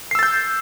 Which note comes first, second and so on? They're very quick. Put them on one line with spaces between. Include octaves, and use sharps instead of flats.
C7 E6 A6 G6